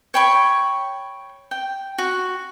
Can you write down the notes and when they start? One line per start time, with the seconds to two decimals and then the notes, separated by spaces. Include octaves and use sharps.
0.14 C#5 G5 B5 C#6
1.51 G5
1.98 F#4